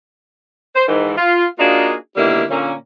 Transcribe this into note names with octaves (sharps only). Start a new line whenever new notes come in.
C5
G#2 D#3 E3
F4
A#3 D4 D#4 F4 F#4 G#4
B2 D3 D#3 G3 A#3 E4
A#2 D3 A#3 C#4